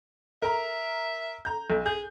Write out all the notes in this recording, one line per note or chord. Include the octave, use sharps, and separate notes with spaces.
A#4 E5 A#5
A#5 G6
B1
G#4 G6